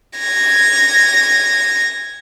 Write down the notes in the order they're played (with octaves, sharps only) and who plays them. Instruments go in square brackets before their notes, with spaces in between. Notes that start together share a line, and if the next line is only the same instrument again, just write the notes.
[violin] G#6 A#6